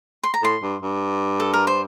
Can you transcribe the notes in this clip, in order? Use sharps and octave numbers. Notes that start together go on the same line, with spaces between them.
C6
A#5
A2 C6
G2
G2
A4
A#4
C5